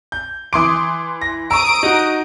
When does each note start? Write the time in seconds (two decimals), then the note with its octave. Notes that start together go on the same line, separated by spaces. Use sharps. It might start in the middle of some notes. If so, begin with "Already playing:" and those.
0.12 G6
0.53 E3 C6 D6 D#6 D7
1.21 A#6
1.51 A#5 C#6 D#6 E6 D7
1.83 D#4 F#4